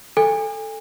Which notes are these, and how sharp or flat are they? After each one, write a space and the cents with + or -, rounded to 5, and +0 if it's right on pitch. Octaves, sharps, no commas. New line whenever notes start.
A4 -5 G#5 -35